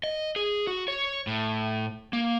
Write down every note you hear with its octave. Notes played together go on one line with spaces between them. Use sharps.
D#5
G#4
F#4
C#5
A2
A#3